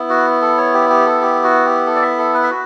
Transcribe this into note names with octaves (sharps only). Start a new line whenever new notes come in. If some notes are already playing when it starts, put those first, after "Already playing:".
Already playing: B3 E4
F#4
A4
C#5
G4
G4
A4
G4
F#4
G4
A4
D5
E5
A4
B4
E5
F#4